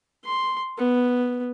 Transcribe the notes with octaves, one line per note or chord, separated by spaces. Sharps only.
C6
B3